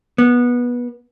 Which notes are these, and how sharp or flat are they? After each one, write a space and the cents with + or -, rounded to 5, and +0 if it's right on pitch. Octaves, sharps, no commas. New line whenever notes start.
B3 -20